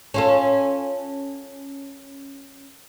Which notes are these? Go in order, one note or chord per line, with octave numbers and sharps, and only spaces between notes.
C#4 F4 A4